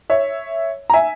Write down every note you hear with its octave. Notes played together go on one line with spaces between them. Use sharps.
C#5 E5
A#5
E5 G#5